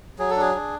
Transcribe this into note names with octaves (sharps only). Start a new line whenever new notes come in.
F#3 G#4
A4
D4 G#4
D4